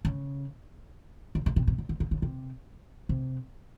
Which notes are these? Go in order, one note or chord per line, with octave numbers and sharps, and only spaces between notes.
C#3
C#3
C#3
C3
C3
D3
D3
C#3
C#3
C3
C3